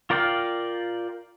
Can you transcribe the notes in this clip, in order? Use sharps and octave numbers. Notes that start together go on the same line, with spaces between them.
F4 A#4 D5 F5 G5